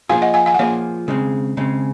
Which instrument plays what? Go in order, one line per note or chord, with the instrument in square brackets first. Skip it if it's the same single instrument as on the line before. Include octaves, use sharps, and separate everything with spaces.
[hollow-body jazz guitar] F3 A#3 F4 G#4 [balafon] F5 G#5
[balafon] D#5 F#5
F5 G#5
F5 G#5
F#5
[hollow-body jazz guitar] F3 A#3 F4 G#4 [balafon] C#5 F5
[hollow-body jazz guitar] C#3 G#3 C4
C#3 G#3 C4